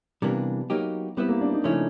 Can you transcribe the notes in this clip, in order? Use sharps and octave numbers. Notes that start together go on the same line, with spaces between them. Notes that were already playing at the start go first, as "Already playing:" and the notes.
C3 E3 G3 A#3 B3 D4
F#3 A#3 D#4 G4
G3 B3 C4 E4
A#3
D4
D#4
C#3 F3 A3 C#4 E4